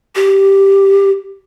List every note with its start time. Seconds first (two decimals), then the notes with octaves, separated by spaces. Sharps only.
0.15 G4